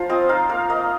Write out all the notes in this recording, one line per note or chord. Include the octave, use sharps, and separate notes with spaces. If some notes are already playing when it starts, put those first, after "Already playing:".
Already playing: F3 F4 C5
C4 D#5
D#4 F5
A#3 F5
A#3 D#5